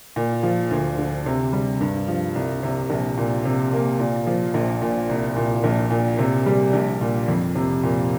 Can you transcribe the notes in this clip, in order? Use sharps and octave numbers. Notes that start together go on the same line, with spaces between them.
A#2
F3
D2
D3
C3
G3
G2
F3
C2
C3
A#1
A#2
C3
A#3
A#2
F3
A#1
A#2
C2
A#2
A#1
A#2
C3
G3
A#1
A#2
F2
C3
A#2